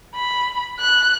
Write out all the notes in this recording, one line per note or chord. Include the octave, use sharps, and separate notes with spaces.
B5
F#6